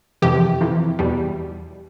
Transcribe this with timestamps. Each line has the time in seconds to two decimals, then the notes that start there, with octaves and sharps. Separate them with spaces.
0.22 F2 C3 E3 G4
0.61 F2 C3 E3
0.99 E2 B2 G3